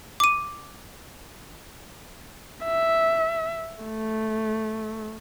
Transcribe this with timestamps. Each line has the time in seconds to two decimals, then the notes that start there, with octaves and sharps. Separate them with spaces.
0.20 D6 D#7
2.65 E5
3.84 A3